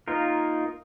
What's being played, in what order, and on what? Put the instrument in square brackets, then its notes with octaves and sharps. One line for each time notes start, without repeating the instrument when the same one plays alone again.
[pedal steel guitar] A#3 D#4 F4 A#4